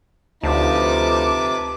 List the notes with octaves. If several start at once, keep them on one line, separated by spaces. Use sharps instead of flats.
D2 C3 F3 D#4 B4 A5 D6